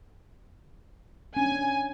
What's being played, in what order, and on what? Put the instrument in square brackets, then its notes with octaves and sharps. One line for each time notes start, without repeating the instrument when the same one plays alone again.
[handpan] C#4 D4 [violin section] G#5